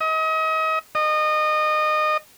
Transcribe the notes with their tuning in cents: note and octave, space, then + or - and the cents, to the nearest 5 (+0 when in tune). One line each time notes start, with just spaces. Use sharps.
D#5 +35
D#5 -25